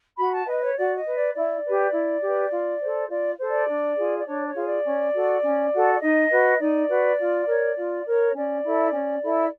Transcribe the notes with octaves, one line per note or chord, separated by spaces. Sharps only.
F#4 B5
A5
B4 D#5
C#5
F#4 D5
D#5
B4
D5
E4 D5
G4 B4
E4
G4 B4
F4
A4 C5
F4 D5
A4 C5
D5
D4
F4 G#4
D5
D4 C#5
C#5
F4 G#4
D5
C#4
F#4 A4
C#4
F#4 A4
D5
D#4 D#5
F#4 B4
D#4 D5
F#4 B4
F4
A#4 C#5
F4
A#4 C#5
C#4 D5
E4 A4
C#4
E4 A4